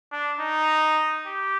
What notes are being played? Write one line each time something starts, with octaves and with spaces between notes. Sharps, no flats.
D4
D#4
G4